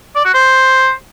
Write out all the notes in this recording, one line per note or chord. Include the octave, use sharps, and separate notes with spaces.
D5
F#4
C5